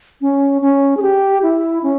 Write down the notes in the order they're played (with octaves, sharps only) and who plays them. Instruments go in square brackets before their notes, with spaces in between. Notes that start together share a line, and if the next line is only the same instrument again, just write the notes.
[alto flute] C#4
C#4
G#4
G4
E4
C#4